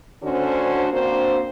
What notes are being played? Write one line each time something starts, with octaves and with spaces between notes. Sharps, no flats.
D2 D3 C#4 D4 F#4 C5
A#3 C4 D4 F#4 C5